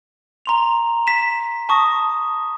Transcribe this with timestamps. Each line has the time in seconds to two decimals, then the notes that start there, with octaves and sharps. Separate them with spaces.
0.46 A#5 C6 F7
1.07 B6 E7
1.69 A5 C#6 D#6 A#6